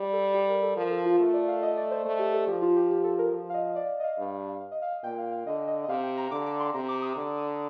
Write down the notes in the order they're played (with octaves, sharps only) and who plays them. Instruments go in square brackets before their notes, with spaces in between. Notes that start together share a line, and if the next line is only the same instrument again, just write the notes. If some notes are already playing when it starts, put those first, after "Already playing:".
Already playing: [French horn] G3 [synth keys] G4
[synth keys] A4
G4
A#4
A4
[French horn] F3 [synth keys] A#4
[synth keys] A4
F4
[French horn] A3 [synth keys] A4
[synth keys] D5
F5
D#5
D5
C5
[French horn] A3
[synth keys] G4
A4
[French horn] F3 [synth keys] G4
[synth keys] F4
G4
G4
A4
A#4
[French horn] F3
[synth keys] F5
D#5
D5
D5
D#5
F5
[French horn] G2
[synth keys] F5
D#5
F5
F5
[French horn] A#2 [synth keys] G5
[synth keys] F5
F5
[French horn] D3 [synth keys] D#5
[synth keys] D#5
D#5
[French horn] C3 [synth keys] F5
[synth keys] G5
A#5
[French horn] D3 [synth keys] D6
[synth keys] D6
C6
[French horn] C3 [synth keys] A#5
[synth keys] D6
D#6
[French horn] D3
[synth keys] D#6